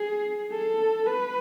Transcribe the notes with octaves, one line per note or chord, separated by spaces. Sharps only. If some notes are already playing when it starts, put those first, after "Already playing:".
Already playing: G#4
A4
B4